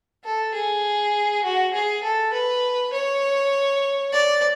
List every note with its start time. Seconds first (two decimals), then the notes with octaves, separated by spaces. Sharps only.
0.24 A4
0.54 G#4
1.44 F#4
1.73 G#4
2.03 A4
2.33 B4
2.93 C#5
4.12 D5